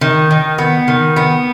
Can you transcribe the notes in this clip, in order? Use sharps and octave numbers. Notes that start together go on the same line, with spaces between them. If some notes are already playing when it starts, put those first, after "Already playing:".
D#3
D#3
B3
D#3
B3